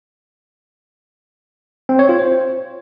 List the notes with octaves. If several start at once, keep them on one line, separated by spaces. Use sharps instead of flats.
C4
C#5
F4
C5